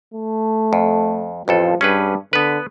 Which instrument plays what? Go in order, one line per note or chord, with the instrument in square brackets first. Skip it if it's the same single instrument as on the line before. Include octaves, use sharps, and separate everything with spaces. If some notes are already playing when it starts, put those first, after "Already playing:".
[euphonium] A3
[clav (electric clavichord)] F2
[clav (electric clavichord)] A1 F2 A4 [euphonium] F3
[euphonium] G2 [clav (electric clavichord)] C#4 G#4 B4
[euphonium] D3 [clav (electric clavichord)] B3 B4